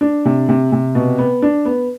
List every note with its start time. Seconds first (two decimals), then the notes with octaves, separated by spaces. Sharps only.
0.01 D4
0.25 C3
0.49 C3
0.72 C3
0.95 B2
1.18 B3
1.42 D4
1.65 B3